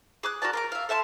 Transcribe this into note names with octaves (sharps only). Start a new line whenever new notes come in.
G#4 D6 F#6
F#4 A#4 D5 A5
A#4 C6 D6
E5 F5
A4 E5 A5 C6